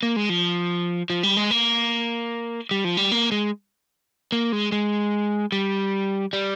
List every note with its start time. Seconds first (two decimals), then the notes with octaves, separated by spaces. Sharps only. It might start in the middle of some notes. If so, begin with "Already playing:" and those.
0.03 A#3
0.16 G#3
0.29 F3
1.10 F3
1.23 G3
1.37 G#3
1.51 A#3
2.71 G3
2.84 F3
2.97 G3
3.12 A#3
3.32 G#3
4.32 A#3
4.52 G#3
4.72 G#3
5.52 G3
6.33 G3